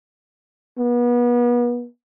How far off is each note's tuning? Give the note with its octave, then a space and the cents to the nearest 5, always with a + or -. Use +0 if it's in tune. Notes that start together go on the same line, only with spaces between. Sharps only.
B3 -35